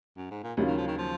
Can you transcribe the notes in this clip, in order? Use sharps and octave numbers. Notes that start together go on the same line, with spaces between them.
F#2
G#2
A#2
D#2 C#3 F#3 C#4 F4
D#3
F3
D#3
F3